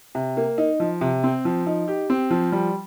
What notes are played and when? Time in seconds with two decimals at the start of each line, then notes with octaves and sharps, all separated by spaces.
0.15 C3
0.37 A#3
0.58 D#4
0.80 F3
1.01 C3
1.24 C4
1.45 F3
1.66 D#4
1.88 G4
2.10 C4
2.30 F3
2.52 G3